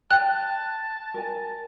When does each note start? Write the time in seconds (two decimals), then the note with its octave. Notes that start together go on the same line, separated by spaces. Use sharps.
0.11 G5 A5 F#6
1.14 A#4 G#5